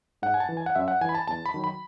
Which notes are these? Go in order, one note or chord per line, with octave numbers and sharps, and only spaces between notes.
G#2 F#5
G#5
A5
E3
G#5
F#5
F#2 E5
F#5
E3 G#5
B5
A5
E2 A5
B5
D#3 F#3
B5